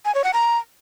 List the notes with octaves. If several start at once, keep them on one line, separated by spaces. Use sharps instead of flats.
G#5
C#5
F#5
A#5